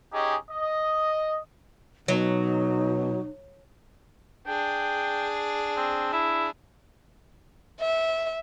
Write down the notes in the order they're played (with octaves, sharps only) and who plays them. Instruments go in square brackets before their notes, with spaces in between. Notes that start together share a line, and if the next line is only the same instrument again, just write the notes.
[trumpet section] C#4 D#4 G4 G#4 D#5
D#5
[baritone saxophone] B2 [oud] F#3 [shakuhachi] D#4
[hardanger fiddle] D4 G#4 [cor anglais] G5
[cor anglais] C4
E4
[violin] E5